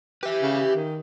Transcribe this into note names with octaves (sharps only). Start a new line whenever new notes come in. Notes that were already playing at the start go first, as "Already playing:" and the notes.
G4 B4 E5
C#3
D#3